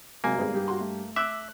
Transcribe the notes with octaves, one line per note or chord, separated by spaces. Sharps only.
C3 F#3 G#3 A#3 G#5
G#1 G3 B3 G#4
G2 G4
F#4 C6
A3
E5 D6 E6 F#6